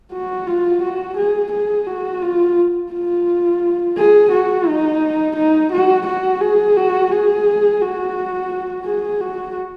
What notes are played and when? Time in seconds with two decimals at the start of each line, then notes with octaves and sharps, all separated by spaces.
0.13 F#4
0.47 F4
0.82 F#4
1.17 G#4
1.52 G#4
1.87 F#4
2.22 F4
2.92 F4
3.97 G#4
4.31 F#4
4.67 D#4
5.36 D#4
5.72 F#4
6.06 F#4
6.41 G#4
6.77 F#4
7.11 G#4
7.81 F#4
8.86 G#4
9.21 F#4